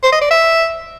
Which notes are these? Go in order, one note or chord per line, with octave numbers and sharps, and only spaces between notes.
C5
D#5
D5
E5